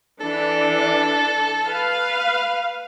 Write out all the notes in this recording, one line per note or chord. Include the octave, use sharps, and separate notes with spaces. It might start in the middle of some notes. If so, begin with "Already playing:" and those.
E3 D4 A4
B4 F5